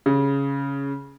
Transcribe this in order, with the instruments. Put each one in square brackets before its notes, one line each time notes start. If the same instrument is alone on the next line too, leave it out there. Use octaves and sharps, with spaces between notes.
[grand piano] C#3